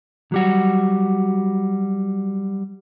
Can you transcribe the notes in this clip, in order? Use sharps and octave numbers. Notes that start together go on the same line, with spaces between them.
F#3 G3 F#4